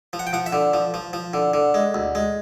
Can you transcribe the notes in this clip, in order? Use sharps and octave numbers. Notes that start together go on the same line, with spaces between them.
F3
F#5
G5
F3 F#5
E5
D3
F3
F3
F3
D3
D3
G#3
D2
G#3